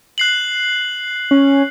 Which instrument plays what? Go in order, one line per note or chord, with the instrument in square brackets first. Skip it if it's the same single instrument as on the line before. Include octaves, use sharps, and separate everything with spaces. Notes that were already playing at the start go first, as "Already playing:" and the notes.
[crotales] F#6 C7 F#7
[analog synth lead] C#4